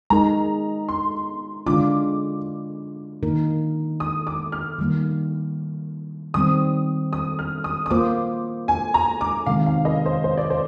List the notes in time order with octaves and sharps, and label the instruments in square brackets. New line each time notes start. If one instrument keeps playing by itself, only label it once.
[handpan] G#3 D#4 A#4 [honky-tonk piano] A#5
[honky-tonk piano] C6
[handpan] D3 G#3 D4 F4 [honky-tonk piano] D6
[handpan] D#3 A#3 D#4 A#4
[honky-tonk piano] D#6
D6
F6
[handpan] D#3 G3 A#3
[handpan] D#3 G3 C4 [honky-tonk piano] D#6
[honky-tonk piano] D#6
F6
D#6
D#6
[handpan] A#3 F4 C5 [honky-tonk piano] D6
[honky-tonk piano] G#5
A#5
D6
[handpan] C3 D#3 G#3 C4 [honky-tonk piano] F5
[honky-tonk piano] F5
D#5
C5
C5
D5
C5